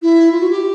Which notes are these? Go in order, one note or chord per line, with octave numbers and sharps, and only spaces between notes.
E4
F4
F#4
G4